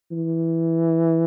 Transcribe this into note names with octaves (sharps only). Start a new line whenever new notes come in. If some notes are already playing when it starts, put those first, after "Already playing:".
E3